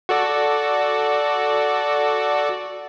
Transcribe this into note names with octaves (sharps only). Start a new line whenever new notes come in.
F#4 A4 D5